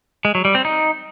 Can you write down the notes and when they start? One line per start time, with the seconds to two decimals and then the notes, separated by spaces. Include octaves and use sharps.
0.25 G#3
0.35 F#3
0.45 G3
0.55 C4
0.65 D#4